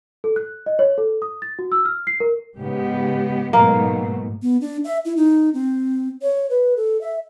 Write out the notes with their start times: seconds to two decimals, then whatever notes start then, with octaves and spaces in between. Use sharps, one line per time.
0.24 A4
0.36 F#6
0.66 D#5
0.79 C#5
0.98 A4
1.22 D#6
1.42 A6
1.59 F#4
1.72 E6
1.85 F6
2.07 C7
2.20 A#4
2.57 G#2 C#3 G#3 B3 G4
3.53 G#2 B2 F#3 A3 A#3
4.42 B3
4.61 D4
4.84 E5
5.05 E4
5.16 D#4
5.54 C4
6.22 C#5
6.50 B4
6.77 A4
7.01 E5